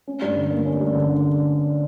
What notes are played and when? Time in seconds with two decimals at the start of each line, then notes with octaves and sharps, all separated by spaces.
0.07 C#4
0.22 G2
0.36 D3
0.50 A#3
0.65 C#4
0.81 G2
0.95 D3